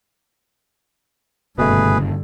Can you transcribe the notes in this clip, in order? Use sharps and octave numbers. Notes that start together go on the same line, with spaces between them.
F#1 G2 B2 D3 A3 G#4 B4